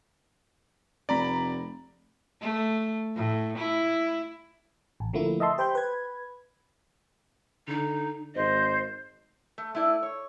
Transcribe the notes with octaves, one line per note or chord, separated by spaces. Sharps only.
F1 D5 A#5 B5
A3
A2
E4
A1
D3 F3 A3 A#3 E4
D#5 E5 A5 C6
G4 C5 G5 B5 G6
B4 G#6
D3 D#4
G#1 C5 D#5
A3
A3 E4 D5
C#5